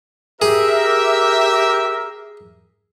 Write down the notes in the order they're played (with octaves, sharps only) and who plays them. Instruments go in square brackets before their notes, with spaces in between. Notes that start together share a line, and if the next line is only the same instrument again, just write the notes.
[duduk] G4 [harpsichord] G#4 [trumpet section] A#4 E5